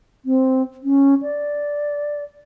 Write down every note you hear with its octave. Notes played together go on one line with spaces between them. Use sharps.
C4
C#4
D5